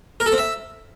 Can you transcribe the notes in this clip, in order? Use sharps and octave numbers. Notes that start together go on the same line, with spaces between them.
A#4
A4
C4
E5